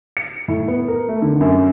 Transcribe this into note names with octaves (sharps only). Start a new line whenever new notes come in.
C#7
A2
B3
A#4
A3
D3
F#2